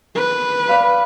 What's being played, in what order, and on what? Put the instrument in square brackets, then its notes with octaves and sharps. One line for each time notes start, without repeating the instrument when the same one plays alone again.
[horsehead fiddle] B4
[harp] D5 F5 B5